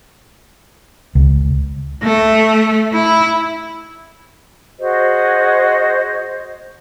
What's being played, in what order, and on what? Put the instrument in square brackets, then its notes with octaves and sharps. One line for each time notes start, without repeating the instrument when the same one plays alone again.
[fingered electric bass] C#2
[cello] A3
E4
[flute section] F#4 G#4 C5 D#5